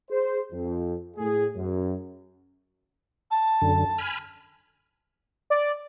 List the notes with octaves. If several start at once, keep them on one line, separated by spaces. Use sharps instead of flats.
G#4 C5
F2
A2 G#4
F#2
A5
F#2 D3
G#5 B5 F6
D5